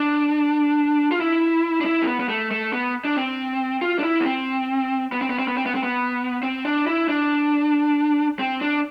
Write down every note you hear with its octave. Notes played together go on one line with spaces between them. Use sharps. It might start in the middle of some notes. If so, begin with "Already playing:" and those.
Already playing: D4
F4
E4
D4
E4
C4
B3
B3
A3
A3
B3
D4
C4
F4
D4
E4
B3
C4
B3
C4
B3
C4
B3
C4
B3
C4
B3
C4
D4
E4
D4
C4
D4